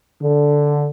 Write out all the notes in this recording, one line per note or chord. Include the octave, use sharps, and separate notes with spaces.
D3